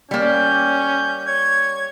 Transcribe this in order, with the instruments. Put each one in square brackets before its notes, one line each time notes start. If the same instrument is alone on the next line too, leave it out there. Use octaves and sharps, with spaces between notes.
[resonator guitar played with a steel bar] G3 A#3 [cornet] C#4 [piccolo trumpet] G6
[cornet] C#5 [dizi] G#6